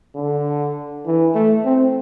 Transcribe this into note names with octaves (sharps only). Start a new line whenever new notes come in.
D3
E3
A3
C4